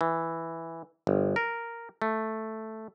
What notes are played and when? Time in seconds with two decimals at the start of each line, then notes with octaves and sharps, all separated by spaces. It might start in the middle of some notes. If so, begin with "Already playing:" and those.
0.01 E3
1.07 G1
1.36 A#4
2.02 A3